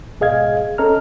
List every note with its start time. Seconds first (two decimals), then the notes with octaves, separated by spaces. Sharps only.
0.20 G#2 B2 G#4 D#5 F5 G#6
0.78 C#4 A4 D#5 A#5 F6